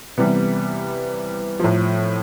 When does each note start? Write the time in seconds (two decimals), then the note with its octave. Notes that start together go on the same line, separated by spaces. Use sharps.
0.18 C3 E3 G3 B3
1.60 A2 F3